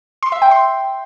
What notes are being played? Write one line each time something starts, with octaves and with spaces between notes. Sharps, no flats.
C6
E5
G5
C6